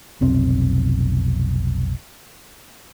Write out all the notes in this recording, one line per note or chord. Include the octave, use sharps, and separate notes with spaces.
F1 B1 C4